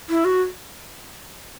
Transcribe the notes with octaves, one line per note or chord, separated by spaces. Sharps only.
E4
F#4